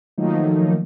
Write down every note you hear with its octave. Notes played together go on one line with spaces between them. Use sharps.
D#3 F3 F#3 A3 A#3 D#4